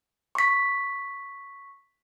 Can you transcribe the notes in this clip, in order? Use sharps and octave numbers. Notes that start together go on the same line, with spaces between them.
C#6 B6